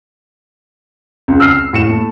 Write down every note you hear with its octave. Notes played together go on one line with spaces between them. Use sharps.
C#2
E6 F6 C7
A2 C#7 E7
A3